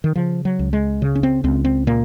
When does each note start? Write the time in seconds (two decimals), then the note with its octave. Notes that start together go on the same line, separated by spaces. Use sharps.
0.04 D#3
0.16 C#3 F3
0.45 F#3
0.59 C#2
0.73 G#3
1.02 C#3
1.15 C#4
1.23 C4
1.44 C#2 C4
1.65 C4
1.87 A#2 A#3